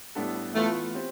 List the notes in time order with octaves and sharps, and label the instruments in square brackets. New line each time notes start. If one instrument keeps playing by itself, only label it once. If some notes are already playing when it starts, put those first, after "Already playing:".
[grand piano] A2 G3 B3 D4 A4
[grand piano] E3 B3 F4 B4 [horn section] A3
[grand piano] C4 G4